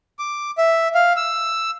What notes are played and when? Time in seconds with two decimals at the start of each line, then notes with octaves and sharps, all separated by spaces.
0.19 D6
0.58 E5
0.95 F5
1.16 E6